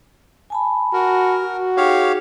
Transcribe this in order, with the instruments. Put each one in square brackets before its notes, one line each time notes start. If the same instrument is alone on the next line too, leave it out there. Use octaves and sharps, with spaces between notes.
[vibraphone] G#5 A5 B5
[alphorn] F#4 [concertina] A#4
[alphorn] F#4
[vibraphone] D#4 G#4 [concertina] G4 C#5 F5